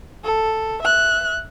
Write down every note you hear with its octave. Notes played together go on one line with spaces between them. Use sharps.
A4
E5 F#6